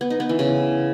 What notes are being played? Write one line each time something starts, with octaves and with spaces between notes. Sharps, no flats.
B3
D#4
B3
E3
C#3